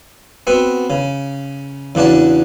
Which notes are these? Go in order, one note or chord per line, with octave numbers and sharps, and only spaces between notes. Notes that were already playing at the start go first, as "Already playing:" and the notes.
B3 C4 F#4
C#3
E2 C#3 D4 F#4 A5